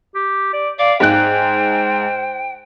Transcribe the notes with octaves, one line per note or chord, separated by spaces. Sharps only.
G4
D5
D5 F5
G#2 G#4 C5 G5 F#6